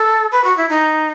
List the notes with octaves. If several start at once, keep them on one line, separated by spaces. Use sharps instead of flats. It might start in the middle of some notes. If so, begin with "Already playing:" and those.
Already playing: A4
B4
F#4
E4
D#4